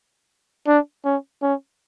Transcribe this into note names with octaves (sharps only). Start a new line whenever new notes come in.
D4
C#4
C#4